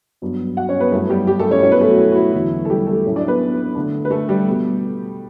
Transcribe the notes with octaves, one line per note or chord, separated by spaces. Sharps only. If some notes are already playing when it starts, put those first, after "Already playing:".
G2 F#3 B3 D4
F#4 F#5
C#4 C#5
B3 B4
G2 F#3 A3 B3 E4 A4
G3 G4
G3 G4
A3 A4
C#4 C#5
B2 F#3 C#4 E4 C#5
B3 B4
A3 A4
F#4
E4
F#4
E4
E2 D3 F#3 E4
A4
G3 G4
A3 A4
A2 F#3 A3 C#4 E4
D4 D5
B3 B4
D3 A3 D4
B4
A3 A4
G3 G4
B2 G3 B3